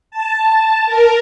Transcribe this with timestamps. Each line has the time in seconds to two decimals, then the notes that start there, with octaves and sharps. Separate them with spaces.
0.11 A5
0.86 A#4